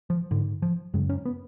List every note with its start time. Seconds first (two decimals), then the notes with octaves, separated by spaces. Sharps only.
0.10 F3
0.31 G#2 D3
0.62 F3
0.94 F#2 C#3 G#3
1.09 C#4
1.25 B3